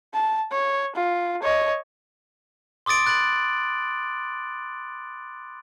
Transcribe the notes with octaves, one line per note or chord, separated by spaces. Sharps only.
A5
C#5
F4
C#5 D#5
C6 D6 D#6 A6 D7
B5 F#6 A6 D7 F#7